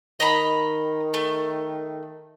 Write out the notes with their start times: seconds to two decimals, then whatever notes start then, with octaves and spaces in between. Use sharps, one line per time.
0.20 D#3 D#5 A#5 B5
1.14 A3